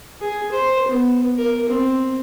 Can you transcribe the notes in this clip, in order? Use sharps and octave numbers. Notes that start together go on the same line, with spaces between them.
G#4
C5
B3
A#4
C4